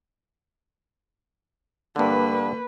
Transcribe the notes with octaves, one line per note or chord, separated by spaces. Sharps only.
G2 D3 A#3 B4